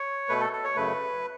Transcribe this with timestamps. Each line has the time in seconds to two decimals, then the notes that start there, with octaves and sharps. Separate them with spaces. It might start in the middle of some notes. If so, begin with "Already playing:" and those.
Already playing: C#5
0.29 B2 A3 B4
0.40 A4
0.53 A4
0.64 C#5
0.76 F#2 C#3 A3 B4